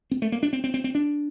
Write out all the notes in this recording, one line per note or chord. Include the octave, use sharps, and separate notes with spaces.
C4
A3
A#3
D4
C4
C4
C4
C4
D4